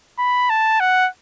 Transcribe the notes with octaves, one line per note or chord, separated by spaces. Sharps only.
B5
A5
F#5